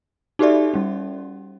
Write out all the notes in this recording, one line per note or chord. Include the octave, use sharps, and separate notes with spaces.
D#4 F#4 G4 A4 D5 E5
G3 C#4